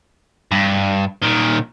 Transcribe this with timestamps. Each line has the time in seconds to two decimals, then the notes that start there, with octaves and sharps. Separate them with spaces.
0.51 G2
1.23 A#2 D#3